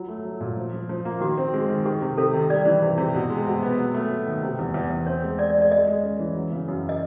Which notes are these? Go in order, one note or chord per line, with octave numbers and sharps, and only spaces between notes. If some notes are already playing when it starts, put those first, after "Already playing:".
Already playing: F#3 F4
A3
F#3
A#2
F3
F3
F3
A#3
D#3 F#4
C4
G#3
D#3
D#3 G4
C3
C3 A4
D#3
G3 D5
E3
C3
C3
B2
G#3
B2
B3
F#3
A3
F#3
D#3
C3
E2
E2
E2
C4 C#5
G#3
C4 D5
G#3
D5
G#3 D#5
G#3
C#4
E3
F#3
C#3
F#2
D#5